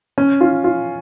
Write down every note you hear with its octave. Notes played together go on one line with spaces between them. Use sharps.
C#4
F4
F4